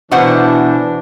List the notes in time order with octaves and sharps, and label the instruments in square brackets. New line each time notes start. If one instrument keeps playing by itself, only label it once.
[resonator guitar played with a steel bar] B2 C5 F#5 [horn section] E3 D4